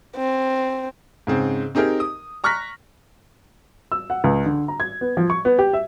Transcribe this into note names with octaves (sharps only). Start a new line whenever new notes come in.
C4
G#2 C#3 C4
C4 D#4 G4 G#4 A#4
D#6
A#5 C#6 F6 F#6 A#6 B6
E6
F#5
C#2
D3
A#5
G#6
B3
F3
C#6
B3
G4
E5